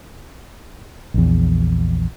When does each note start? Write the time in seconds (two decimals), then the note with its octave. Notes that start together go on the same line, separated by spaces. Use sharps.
1.14 A#1 E2